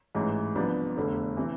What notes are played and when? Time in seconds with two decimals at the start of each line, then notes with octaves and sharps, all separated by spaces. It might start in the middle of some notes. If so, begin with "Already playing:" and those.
0.15 A1 G#2 E3
0.55 C2 C3 F3 B3 D4
0.97 F1 E2 D3
1.37 C3 E3